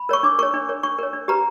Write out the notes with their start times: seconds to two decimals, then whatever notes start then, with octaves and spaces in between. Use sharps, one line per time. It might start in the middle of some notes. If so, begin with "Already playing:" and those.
Already playing: B5
0.09 A#4 C#5 C#6
0.23 D4 D6
0.39 A#4 C#5 C#6
0.54 D4
0.69 A#4 C#5
0.83 D4 C#6
0.98 A#4 C#5
1.13 D4
1.28 G4 B4 A#5